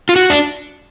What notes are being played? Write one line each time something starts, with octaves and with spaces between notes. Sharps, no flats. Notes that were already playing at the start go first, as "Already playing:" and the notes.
F4
F#4
D4